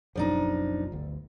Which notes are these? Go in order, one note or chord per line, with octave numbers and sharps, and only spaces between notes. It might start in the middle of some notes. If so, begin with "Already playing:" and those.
F#1 B1 F#2 F3 D4 D#4
G1 D2